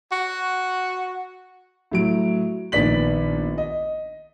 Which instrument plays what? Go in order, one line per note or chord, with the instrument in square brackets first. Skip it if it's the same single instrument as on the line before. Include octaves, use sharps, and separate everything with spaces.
[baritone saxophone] F#4
[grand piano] A2 F#3 D7
A#1 D#3 B3 D5 B6 F#7
D#5